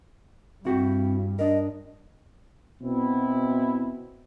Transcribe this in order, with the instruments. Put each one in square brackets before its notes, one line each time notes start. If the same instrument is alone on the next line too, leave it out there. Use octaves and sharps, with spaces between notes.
[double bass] G2 [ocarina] C4 [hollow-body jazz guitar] E4 F#4 G4
[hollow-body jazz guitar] D4 A#4 [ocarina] D#5
[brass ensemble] B2 C4 E4